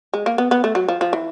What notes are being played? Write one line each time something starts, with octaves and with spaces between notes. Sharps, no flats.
G#3
A#3
B3
B3
A3
F#3
F3
F3
E3